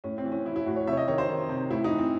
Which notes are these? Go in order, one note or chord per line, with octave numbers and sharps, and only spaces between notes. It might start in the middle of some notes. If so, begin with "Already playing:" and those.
A2 C#4
C4
E3
C#4
E3 E4
E4
A2 F#4
C#5
C3 C#5 E5
D#5
D#3 C#5
C5
D#3
C3
A2 E4
D#4
E3
C4